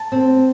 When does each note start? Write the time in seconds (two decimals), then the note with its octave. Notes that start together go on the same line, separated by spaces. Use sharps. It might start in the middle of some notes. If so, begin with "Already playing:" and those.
Already playing: A5
0.12 C4